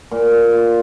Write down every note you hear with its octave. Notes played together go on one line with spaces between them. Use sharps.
A#2
A#2
F4